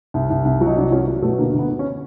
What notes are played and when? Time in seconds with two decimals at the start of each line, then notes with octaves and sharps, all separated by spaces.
0.14 C2
0.30 C2
0.45 C2
0.61 F#3
0.67 D#4
0.76 C2 D4
0.91 F#3 C#4
1.08 F#3
1.22 B2 A3
1.39 D2 A#3
1.53 D2
1.59 B3
1.70 D2
1.79 C#4